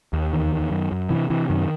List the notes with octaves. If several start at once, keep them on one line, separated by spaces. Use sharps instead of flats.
D#2
E2 D#3
E2
F#2
F#2
C3 E3
C3 E3
F#2 D#3